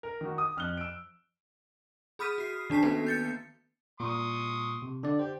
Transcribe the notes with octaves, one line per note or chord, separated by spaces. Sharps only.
A#4
D#3 F#4
D#6
F2 F6 F#6 G7
E6 D7
G#4 B5 D#6 F6 B6 D#7
F#4 C7
D#3 D4 A5 B6 C7
A#3 B3 C#4 F#4 A4 B4
G6 A6 C#7
A#2 C6 C#6 D#6
C3
D3 D4 D5
G4 C5